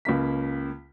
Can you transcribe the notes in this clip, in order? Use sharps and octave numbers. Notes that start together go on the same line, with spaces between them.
C#2 C#3 A#3 B6